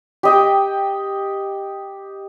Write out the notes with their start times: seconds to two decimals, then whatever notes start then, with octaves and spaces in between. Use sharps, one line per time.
0.23 G4 D#5 G5